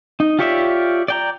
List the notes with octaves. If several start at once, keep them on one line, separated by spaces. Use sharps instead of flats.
D#4
F4 G4 C#5 D5 E5
D5 G5 A#5